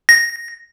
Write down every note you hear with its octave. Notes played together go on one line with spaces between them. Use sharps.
A#6